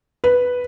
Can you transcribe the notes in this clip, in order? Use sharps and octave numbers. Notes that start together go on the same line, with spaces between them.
B4